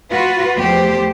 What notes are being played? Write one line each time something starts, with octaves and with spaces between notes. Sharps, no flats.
F4 F#4 B4
E2 F3 A3 G4 C5